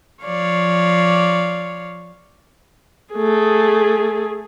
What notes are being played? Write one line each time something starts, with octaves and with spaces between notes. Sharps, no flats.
F3 C#5 D5 F5
A3 G#4